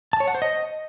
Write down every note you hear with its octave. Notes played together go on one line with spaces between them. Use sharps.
A5
C#5
F#5
C5
D#5